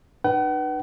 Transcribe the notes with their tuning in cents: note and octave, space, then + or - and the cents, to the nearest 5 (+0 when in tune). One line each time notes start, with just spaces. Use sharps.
D#4 -45 B4 -10 F#5 +45